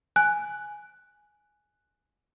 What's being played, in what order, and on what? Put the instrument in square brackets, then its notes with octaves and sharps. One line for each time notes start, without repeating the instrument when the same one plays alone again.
[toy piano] G#5 [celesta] F#6